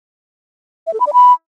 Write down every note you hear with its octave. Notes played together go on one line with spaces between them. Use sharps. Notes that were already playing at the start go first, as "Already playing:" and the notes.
E5
A4
B5
D5
B5